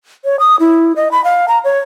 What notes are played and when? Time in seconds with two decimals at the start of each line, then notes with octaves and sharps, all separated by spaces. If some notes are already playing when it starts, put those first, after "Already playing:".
0.25 C#5
0.40 D#6
0.60 E4
0.96 D#5
1.11 B5
1.24 F5
1.48 A#5
1.64 C#5